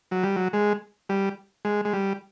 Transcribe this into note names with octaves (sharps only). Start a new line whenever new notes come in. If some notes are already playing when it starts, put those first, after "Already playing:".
F#3
G3
F#3
G#3
G3
G#3
G#3
G3